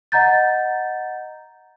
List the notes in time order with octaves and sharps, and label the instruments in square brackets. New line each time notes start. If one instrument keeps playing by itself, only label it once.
[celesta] D#5 F#5 A#5 G6 A6